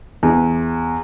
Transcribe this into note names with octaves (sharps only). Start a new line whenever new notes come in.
E2